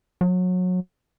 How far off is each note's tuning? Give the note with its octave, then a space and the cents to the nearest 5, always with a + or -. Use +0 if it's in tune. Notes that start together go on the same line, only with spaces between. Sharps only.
F#3 -25